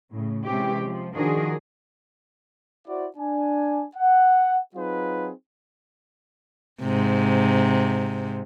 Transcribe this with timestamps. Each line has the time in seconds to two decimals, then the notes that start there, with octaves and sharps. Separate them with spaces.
0.12 A2 C#3
0.46 C3 E3 G#3 C4 C#4 G4
0.84 F3
1.15 D#3 F3 D4 F#4 G#4 A#4
2.87 E4 F#4 C5 D5
3.17 D4 G#5
3.95 F#5
4.75 F#3 C4 D#4 F4 G#4 B4
6.82 G#2 C3